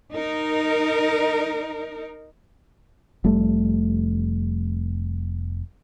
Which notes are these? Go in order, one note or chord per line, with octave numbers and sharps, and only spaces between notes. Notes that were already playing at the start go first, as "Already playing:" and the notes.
D#4 A#4
F1 G3 A3